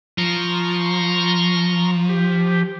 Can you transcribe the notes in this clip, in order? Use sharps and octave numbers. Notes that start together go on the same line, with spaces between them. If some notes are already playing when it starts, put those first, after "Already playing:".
F3 A#5 C6 C#6
G4